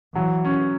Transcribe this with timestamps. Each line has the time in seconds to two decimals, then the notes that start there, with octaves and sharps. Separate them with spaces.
0.15 E3 F#3
0.45 C#4